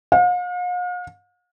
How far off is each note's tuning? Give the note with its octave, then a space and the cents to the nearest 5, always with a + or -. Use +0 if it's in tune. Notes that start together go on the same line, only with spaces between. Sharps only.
F5 +45